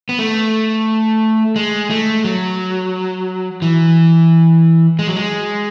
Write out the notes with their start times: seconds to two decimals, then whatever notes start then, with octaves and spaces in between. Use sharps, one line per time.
0.09 B3
0.19 A3
1.56 G#3
1.90 A3
2.24 F#3
3.62 E3
4.99 G#3
5.07 F#3
5.16 G#3